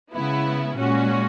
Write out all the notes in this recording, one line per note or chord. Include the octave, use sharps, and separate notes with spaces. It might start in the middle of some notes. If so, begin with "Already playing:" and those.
C#3 G#3 B3 E4
A#2 G#3 C#4 F#4